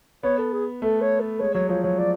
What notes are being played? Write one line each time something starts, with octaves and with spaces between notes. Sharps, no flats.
B3 C#5
A4
G#4
A3 A4
C#5
A4
G#3 C#5
F#3 C#5
F3 C#5
F#3 C#5
F3 D5